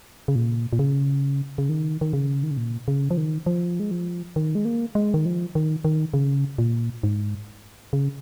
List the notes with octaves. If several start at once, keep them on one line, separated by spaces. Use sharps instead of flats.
C#3
A#2
A#2
C#3
C#3
D#3
D#3
C#3
D#3
C#3
A#2
C#3
F3
D#3
F3
G#3
F3
D#3
G#3
A#3
G#3
D#3
F3
D#3
D#3
C#3
A#2
G#2
C#3